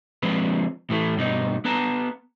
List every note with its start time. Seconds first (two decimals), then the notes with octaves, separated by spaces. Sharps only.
0.23 F3 G#3 C4 B4
0.90 A2 E3 A3
1.17 G2 B2 D#4
1.65 B3 B4 A5 A#5